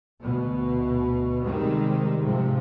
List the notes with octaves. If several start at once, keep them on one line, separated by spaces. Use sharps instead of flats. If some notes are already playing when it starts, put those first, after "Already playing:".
D2 B2
C3 D#3 G3 G#3 C4
G#2 C3 F3